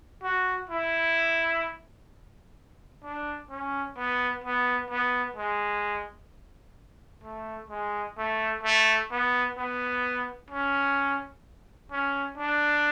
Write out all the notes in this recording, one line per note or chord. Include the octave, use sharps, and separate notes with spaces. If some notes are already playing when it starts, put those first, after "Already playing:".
F#4
E4
D4
C#4
B3
B3
B3
G#3
A3
G#3
A3
A3
B3
B3
C#4
C#4
D4